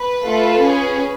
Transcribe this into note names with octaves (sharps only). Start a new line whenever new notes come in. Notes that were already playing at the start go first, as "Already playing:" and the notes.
Already playing: B4
A3 F4 A4
C#4 G#4